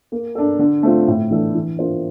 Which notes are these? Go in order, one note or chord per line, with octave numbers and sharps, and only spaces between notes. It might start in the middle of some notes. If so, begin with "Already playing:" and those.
A#3
D4 A4
D3
A3 C4 F4
A2
E3 A3 D4 A4
E3
A#3 D4 F4 C5